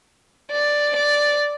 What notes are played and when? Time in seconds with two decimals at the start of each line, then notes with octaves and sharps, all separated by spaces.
0.51 D5
0.96 D5